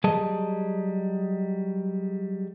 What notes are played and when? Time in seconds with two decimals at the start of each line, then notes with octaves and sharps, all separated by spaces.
0.04 F#3 G3 G#4 D#5 A5